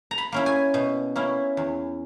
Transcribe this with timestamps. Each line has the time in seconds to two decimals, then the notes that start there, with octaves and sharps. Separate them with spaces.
0.11 A#5
0.18 B5
0.32 A#3 C#4 E4
0.46 G#5
0.74 B2
1.16 A#3 C#4 E4
1.57 E2